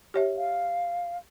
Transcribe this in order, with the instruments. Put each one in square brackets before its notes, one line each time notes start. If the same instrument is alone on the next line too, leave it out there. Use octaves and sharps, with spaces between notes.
[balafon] G4 C#5 E5
[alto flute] F5